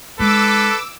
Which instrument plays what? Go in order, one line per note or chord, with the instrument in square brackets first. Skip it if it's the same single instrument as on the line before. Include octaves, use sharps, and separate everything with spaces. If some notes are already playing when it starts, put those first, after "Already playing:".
[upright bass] G#3 D#4 [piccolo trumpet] A4 [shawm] B4 [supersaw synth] D6 E6